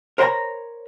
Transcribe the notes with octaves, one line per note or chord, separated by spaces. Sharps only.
A#4 C5 C#5 F#5 A#5 B5